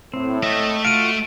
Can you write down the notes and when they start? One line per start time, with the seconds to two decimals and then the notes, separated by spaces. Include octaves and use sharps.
0.14 A2 C4
0.43 A3 D#5 E5
0.85 F4 F#4 F5 D7 D#7